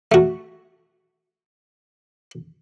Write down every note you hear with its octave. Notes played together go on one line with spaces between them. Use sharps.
A3 F#4